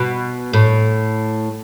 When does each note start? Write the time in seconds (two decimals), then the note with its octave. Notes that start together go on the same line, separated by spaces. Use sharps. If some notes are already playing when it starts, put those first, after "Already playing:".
Already playing: B2
0.53 A2